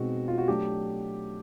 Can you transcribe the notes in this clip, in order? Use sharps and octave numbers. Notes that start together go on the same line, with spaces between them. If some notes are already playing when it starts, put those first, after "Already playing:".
Already playing: B2 G#3 C4 D#4 F#4
F4
F#4
F#3 A3 D4 G4